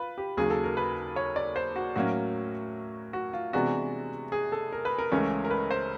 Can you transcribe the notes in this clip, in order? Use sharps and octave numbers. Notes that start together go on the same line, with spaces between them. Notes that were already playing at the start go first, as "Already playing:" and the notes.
Already playing: F4 B4
G4
D#2 C#3 F#3 G#4
A4
A#4
B4
C#5
D5
C5
F#4
A2 F#3 A#3 C#4 F#4
F#4
F4
C3 E3 G#3 B3 D4 F#4
G#4
A4
A#4
B4
A#4
C#2 C#3 E3 A3 C#4
A#4
B4
C5